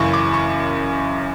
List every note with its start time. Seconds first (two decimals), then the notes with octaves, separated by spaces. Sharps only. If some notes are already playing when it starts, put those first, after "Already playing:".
Already playing: F#1 F#2 C#3 E3 C#6
0.13 D6
0.34 C#6